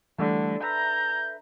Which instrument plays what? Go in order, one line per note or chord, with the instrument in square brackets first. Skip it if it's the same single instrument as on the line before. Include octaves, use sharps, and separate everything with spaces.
[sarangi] D3 [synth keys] E3 G3 A3
[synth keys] A4 B4 E5 [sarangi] A#5 [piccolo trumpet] G6